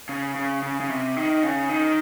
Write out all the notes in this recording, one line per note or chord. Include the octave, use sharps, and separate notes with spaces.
C#3
C#3
C#3
C#3
C3
D#3
C#3
D#3